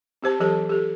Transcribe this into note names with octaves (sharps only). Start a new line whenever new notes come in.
C4 G4 C5 A5
E3 F#3 G4 A4 A5
G4 A4